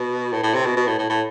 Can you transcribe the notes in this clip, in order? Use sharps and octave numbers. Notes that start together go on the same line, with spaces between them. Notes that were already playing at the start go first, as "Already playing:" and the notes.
Already playing: B2
A2
A2
C3
B2
B2
A2
A2
A2